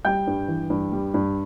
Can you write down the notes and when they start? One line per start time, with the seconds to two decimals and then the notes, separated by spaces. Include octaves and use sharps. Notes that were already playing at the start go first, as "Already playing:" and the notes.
0.05 G3 G5 G6
0.27 G2
0.48 E3
0.70 G2
0.92 G3
1.14 G2